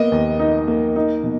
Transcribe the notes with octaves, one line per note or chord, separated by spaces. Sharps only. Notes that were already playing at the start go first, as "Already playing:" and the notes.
Already playing: A#3 B3 D#5
D#2
D#4
A#3
D#4
B2